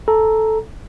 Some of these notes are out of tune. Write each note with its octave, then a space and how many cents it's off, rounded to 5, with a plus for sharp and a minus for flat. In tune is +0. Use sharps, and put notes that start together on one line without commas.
A4 -5 A#5 +0